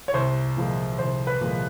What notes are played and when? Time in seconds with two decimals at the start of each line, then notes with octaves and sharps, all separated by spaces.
0.08 C#5
0.14 C2 C5
0.57 A#2 F3 G#3
0.99 C2 C5
1.27 B4
1.41 A#2 F3 G#3